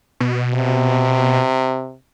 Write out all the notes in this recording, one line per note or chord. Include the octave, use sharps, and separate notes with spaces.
B2
C3